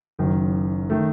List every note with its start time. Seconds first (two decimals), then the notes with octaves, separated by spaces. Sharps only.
0.19 F#1 F#2 D#3
0.90 D#3 A3